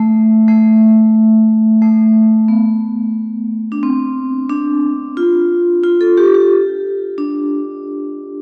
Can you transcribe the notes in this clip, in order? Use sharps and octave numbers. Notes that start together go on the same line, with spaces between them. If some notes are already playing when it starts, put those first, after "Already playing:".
Already playing: A3
A3
A3
B3
D4
C4
D4
F4
F4
A4
G4
G4
D4